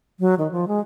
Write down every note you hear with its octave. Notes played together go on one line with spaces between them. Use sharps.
F#3
D#3
F3
G#3